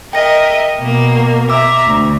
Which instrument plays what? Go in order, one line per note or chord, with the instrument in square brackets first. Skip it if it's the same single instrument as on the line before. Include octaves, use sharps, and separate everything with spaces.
[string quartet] A#4 D#5 E5 [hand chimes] G5 A#6
[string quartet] B2 A#3
[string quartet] E5 A#5 [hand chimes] D6 E6
[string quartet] D2